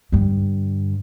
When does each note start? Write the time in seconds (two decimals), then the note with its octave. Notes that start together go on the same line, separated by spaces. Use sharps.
0.12 G2 D3